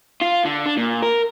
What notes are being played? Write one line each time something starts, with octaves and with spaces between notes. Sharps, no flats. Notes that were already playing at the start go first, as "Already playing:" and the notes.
F4
D3
D4
A#2
A#4